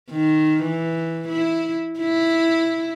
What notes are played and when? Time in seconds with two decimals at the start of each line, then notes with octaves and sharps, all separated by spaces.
0.10 D#3
0.63 E3
1.29 E4
2.00 E4